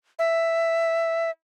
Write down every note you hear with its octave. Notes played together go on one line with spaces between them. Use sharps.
E5